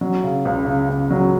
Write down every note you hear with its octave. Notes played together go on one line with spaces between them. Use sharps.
F#3
C#3
C#2
C#3
C#2
F#3